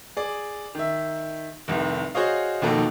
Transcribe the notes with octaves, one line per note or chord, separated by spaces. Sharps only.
G#4 D5
D#3 E5
F1 C2 D#3
F#4 G#4 C5 C#5 D#5 F5
B1 F2 D#3 A#3 F#4 A4